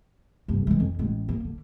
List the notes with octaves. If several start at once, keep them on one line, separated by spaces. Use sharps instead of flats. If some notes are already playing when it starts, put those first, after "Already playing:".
F1 G2
E3 G#3
F2
A1 G#3
A#3
D3